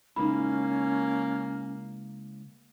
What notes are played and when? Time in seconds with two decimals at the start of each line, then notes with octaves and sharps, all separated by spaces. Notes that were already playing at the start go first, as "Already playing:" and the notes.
0.16 C#3 G#3 A#3 C#4 D#4 E4 B5